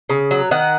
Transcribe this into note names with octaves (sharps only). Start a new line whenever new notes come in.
C#3
F#3
D#3 F#5